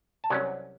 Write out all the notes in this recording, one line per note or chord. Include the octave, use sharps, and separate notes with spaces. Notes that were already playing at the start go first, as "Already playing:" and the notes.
A5
C2 C3 F#3 C#4 G#5